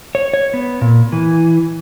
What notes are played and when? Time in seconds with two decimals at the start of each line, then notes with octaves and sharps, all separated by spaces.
0.15 C#5
0.34 C#5
0.54 B3
0.82 A#2
1.12 E3